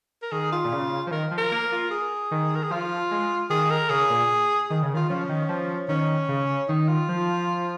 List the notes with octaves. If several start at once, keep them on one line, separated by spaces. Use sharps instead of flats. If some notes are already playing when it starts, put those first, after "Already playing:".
A#4
D#3 G#4
F4
A#2
C#3
F3
D#3 A#4
F3
A#4
A#3
F4
G#4
D#3
A#4
G#4
F3 F4
G#3
D#3 G#4
A#4
C#3 G#4
A#2
D#3 G#4
C#3
D#3 F4
F3 C#4
D#3
F3
D#3 C#4
C#3
D#3 D#4
F4
F3